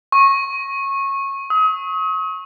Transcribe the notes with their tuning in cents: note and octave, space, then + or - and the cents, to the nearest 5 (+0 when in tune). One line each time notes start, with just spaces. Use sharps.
C#6 -20
D#6 +40